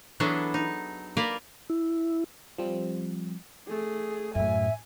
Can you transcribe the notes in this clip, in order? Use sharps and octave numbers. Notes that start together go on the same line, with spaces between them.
E3 F#3 B3 D4 G#4 A4
D#4
A#3 A#4 B4 D5
E4
F3 G3 C4
A3 G#4
F#2 A2 E5 G#5